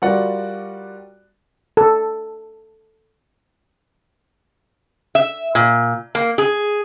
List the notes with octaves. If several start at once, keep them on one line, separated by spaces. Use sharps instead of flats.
G3 F4 F#4 A#4 D5 F#5
A4
E5
A#2
A#3
G#4